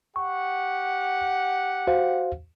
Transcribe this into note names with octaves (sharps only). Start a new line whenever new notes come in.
G4 F#5 C#6
F#4 C5 F5